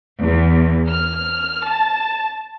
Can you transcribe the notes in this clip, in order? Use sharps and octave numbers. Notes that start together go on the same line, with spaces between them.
E2
F6
A5